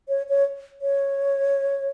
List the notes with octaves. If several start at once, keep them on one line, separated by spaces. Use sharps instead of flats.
C#5
C#5
C#5